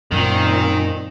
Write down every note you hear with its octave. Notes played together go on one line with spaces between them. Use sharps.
F#2 A#2 D#3 C4